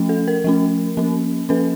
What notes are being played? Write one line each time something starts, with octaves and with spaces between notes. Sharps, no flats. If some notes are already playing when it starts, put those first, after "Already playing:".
Already playing: F3 A3 C#4
A4
A#4
F3 A3 C#4
F3 A#3 C#4
F3 A#3 C#4 A4 B4